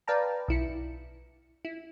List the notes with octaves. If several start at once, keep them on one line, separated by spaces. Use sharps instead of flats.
B4 D5 F5 G5 A5 A#5
B1 E4 C#7
E4